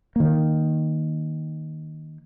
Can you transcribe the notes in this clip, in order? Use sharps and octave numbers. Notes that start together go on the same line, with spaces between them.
D#3 A#3